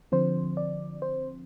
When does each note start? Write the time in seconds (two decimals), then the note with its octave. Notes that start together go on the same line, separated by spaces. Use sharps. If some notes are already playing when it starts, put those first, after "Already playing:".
0.12 D3 F3 C4 C5
0.57 D5
1.02 C5